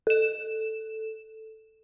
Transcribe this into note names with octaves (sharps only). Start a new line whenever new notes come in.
A4 E7